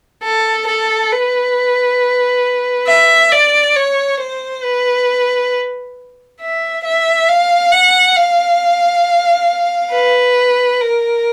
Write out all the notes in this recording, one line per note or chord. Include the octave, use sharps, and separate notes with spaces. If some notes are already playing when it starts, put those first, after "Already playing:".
A4
A4
B4
E5
D5
C#5
C5
B4
E5
E5
F5
F#5
F5
B4
A#4